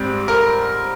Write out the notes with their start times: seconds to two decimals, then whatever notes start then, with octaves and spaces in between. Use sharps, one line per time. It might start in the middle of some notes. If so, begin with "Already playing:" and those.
Already playing: G#2 G3 C4
0.28 A#4